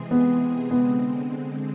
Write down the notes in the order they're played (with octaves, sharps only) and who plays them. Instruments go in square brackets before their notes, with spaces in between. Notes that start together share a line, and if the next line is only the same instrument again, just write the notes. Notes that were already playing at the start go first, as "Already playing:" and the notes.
Already playing: [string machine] C3 E3 G#3 C4 G#4
[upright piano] B3
[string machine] D3 G#3 C4 [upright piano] B3